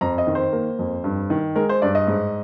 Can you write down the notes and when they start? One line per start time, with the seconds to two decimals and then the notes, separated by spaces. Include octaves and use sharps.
0.01 F2 A#5
0.18 D#5
0.27 D#3
0.35 C5
0.53 A#3
0.79 F2
1.04 G2
1.30 D#3
1.55 G#3 A#4
1.69 C5
1.82 G2 D5
1.95 D#5
2.07 G#2